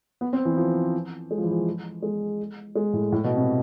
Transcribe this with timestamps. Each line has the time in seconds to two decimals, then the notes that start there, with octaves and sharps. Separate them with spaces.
0.21 B3
0.33 C4
0.45 E3
0.57 F3
1.31 G#3
1.38 F3
1.44 E3
1.51 F3
2.02 G#3
2.75 G#3
2.94 A2
3.12 A2
3.24 B2
3.37 C3